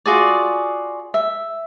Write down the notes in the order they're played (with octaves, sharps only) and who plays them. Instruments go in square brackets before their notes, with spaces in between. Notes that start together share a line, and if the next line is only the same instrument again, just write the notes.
[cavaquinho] F4 F#4 G#4 D5
E5